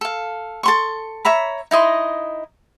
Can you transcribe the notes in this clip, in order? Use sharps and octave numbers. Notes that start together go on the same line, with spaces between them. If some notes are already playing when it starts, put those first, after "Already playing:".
A4 F5
A4 C6 C#6
C#5 E5 A#5 B5
D#4 E4 D#5 C6